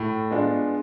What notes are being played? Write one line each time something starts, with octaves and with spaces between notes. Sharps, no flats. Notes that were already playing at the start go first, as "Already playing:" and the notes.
Already playing: A2
G#3 B3 D4 F4